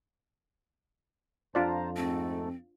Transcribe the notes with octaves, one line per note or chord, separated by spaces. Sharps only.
F2 D4 F4 C5 D5 A5 A#5
G#2 A3 C4 A4